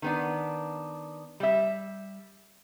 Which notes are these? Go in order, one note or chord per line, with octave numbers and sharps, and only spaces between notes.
D#3 B3 D4
G3 E5